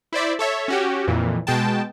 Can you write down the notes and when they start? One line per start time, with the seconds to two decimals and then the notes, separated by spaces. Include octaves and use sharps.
0.13 E4 C5 D5 E5
0.39 A4 C#5 E5
0.68 C#4 F#4 G4
1.08 F2 A#2 E3
1.47 B2 G#3 G5 A5